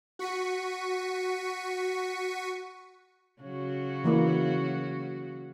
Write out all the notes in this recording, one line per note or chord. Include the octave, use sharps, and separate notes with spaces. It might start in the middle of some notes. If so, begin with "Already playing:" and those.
F#4 C#6 B6 C#7 D#7
C#3 F#3 F#4
E3 A#3 E4